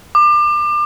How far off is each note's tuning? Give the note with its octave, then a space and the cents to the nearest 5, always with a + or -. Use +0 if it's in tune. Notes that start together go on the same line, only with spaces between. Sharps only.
D6 +30